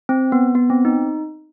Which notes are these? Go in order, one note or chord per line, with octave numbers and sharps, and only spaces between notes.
C4
B3
B3
C4
D#4